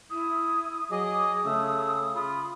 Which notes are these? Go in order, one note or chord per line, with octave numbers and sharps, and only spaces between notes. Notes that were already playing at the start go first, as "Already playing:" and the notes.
E4 D#6
F#3 G#4 D#5 D6 D#6
C#3 A3 E6
F4 B5